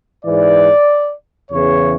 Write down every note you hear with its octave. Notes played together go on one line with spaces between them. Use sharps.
G#2 E3 D5
E2 C#3 E3 C#5